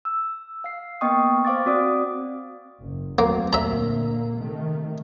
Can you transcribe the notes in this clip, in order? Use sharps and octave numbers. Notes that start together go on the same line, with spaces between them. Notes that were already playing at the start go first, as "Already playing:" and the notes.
E6
F5 C7
A#3 B3 D#5 G5 C#6 D#6
C5 F5 D6 A6
C4 F#4 D5 D#6 D7
F#1
F#3 A3 A#3 C4
A#2 D3 A#3 E5 A#5
C3 D#3 A3